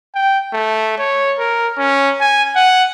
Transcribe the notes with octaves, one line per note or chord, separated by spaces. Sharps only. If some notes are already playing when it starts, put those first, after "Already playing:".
G5
A3
C#5
A#4
C#4
G#5
F#5